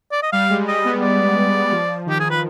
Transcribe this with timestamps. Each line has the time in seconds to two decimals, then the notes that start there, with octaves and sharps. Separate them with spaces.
0.12 D5
0.23 D#5
0.32 G3 F5
0.50 G#3
0.67 G3 D#5
0.85 B3
1.02 D5
1.72 F3
2.06 D#3 G4
2.20 G#4
2.30 B4